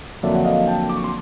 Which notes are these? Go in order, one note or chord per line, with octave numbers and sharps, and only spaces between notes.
F2 D3 F#3 A#3 D4 D5 E5
F#5
D#5 F5
G5 A5
D6
C#6
C6 D6